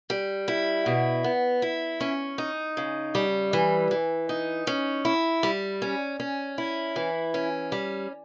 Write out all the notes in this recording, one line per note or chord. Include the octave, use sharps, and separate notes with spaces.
G3
E4
B2
B3
E4
C#4
D#4
C#3
G3
E3
E3
D#4
C#4
E4
G3
C#4
C#4
E4
E3
C#4
G3